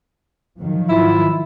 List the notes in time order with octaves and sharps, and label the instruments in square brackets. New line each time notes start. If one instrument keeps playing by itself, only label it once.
[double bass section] D#3 F3 F#3
[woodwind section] G#2 F4 [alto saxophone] E4